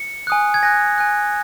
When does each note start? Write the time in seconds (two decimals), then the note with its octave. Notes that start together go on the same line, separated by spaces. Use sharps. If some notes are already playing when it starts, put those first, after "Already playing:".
Already playing: C#7
0.27 G#5 D#6 F#6
0.54 G#6
0.63 G#5 F#6 A#6
0.98 G#5 F#6